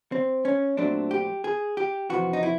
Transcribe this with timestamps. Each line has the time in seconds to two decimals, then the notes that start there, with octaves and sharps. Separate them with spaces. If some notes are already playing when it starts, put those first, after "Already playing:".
0.12 C4
0.45 C#4
0.77 A#2 F#3 A3 C4 D4
1.11 G4
1.44 G#4
1.77 G4
2.09 F2 C3 E3 F#4
2.33 D#4
2.43 E4